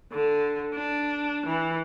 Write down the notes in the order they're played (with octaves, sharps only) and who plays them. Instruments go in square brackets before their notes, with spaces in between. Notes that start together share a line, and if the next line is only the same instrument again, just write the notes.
[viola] D3
D4
E3